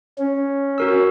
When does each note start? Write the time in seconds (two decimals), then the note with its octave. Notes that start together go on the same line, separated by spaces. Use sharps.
0.18 C#4
0.78 F#4 A#4 E6